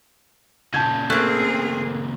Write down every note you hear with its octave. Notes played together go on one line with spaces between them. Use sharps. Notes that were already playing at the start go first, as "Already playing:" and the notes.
A#2 C#3 A5 G6 G#6
A3 A#3 C4 G#4 F#6